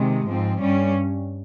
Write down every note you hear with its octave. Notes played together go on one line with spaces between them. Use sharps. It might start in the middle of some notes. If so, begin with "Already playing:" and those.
Already playing: C3 D#3 G#3
G#2 F3 C4
G2 G3 C#4